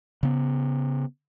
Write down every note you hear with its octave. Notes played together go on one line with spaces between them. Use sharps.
C#3 B3